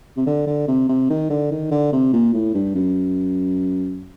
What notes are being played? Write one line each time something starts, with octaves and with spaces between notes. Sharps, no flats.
C3
D3
D3
C3
C3
D#3
D3
D#3
D3
C3
A#2
A2
G2
F#2